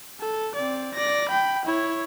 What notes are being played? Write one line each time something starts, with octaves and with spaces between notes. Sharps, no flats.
A4
C4 D5
D5 A#6
G5 B5
E4 C#5